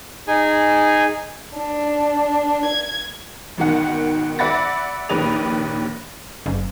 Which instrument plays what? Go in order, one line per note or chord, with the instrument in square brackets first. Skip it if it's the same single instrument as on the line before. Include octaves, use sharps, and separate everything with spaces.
[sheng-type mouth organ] D#4 G#4 G#5
[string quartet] D4
G#6
[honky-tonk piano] G#1 B2 D#3 F#5
D5 E5 F#5 B5 A6 A#6
A#1 D#2 B4 D5 D#6 F7
[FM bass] F#1